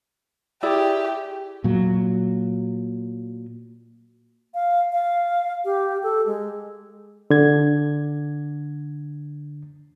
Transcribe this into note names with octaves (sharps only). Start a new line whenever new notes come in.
E4 G4 G#4 D5
A#2 F#3
F5
F5
G4
A4
G#3
D3 G#6